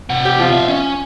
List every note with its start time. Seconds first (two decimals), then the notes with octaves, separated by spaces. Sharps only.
0.10 C3 F#5
0.25 G4
0.39 F3 F4
0.53 E5 F5
0.68 C#4